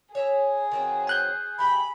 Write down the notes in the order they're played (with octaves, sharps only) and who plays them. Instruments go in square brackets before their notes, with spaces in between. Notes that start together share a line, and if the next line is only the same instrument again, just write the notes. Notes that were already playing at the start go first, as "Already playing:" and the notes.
[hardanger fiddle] G#4 [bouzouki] C#5 E5 A#5
[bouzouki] D#3 F#3 C4
[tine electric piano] G#5 F#6 G6
[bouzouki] E3 G4 G5 [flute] B5